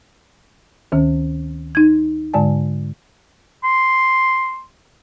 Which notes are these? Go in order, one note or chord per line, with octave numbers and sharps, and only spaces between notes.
D2 D#3 C#4
D#4 G#6
G#2 D3 G#3 D5 G#5 A5
C6